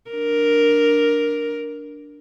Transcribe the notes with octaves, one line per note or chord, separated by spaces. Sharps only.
D4 A#4